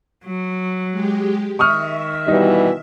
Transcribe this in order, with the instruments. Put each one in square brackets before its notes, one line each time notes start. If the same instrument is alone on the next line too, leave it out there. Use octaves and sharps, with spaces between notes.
[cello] F#3
[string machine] G#3 G4
[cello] D#3 [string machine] E5 [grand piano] C#6 D#6 F6
[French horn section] B2 E3 G3 [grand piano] D#4